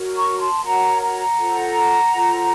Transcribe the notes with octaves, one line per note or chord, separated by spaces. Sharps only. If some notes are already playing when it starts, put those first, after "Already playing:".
Already playing: F#4 A#4 C#5
A#5 C#6
A5 C6
F#4 A#4 C#5 F#5 A#5
F#5 A#5
F4 A4 C5
F4 A4 C5